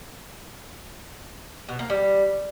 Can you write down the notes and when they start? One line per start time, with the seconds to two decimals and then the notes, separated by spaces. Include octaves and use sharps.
1.69 B2
1.79 A#3
1.90 G3